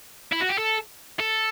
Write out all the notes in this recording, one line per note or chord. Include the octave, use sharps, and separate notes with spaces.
E4
F#4
G4
A4
A4